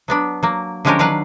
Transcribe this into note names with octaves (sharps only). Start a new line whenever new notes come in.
F#3 B3 D4
F#3 A#3
D3 F3 G#3 C#4 G4 A#4
D#3 F#3 D4 B4 F5 F#5